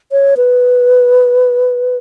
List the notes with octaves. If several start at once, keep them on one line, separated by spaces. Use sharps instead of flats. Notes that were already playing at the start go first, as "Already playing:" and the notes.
C#5
B4